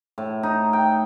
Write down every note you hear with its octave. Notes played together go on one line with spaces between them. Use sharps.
A2
D#4
G5